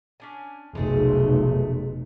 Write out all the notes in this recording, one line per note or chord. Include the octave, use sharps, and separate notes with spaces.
C#4 D4 G#5
F1 B1 G#3 A3 G#4